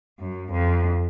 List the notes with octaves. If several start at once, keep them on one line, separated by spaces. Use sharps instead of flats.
F#2
F2